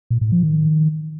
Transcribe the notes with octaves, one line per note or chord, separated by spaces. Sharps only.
A#2
A2
F3
D#3